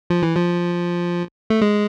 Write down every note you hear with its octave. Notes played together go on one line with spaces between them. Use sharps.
F3
E3
F3
A3
G#3